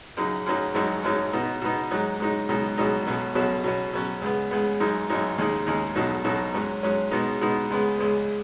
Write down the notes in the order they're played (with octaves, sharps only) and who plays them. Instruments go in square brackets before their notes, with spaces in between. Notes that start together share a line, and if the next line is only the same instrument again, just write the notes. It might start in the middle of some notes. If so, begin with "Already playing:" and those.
[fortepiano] F#2 C#3 F#3 D#4
F#2 C#3 F#3 D#4
G#1 F#2 F#3 D#4
G#1 F#2 F#3 D#4
B2 B3 D#4
B2 B3 D#4
G#2 F#3 D#4
G#2 F#3 D#4
C#2 B2 F#3 D#4
C#2 B2 F#3 D#4
B1 B2 F#3 C#4
B1 B2 F#3 C#4
B2 F#3 C#4
B2 F#3 C#4
C#2 C#3 B3
C#2 C#3 B3
G#1 F#2 F#3 D#4
G#1 F#2 F#3 D#4
D#2 C#3 G#3 D#4
D#2 C#3 G#3 D#4
B1 B2 F#3 D#4
B1 B2 F#3 D#4
G#2 F#3 C#4
G#2 F#3 C#4
B2 G#3 B3 D#4
B2 G#3 B3 D#4
C#2 C#3 G#3 B3
C#2 C#3 G#3 B3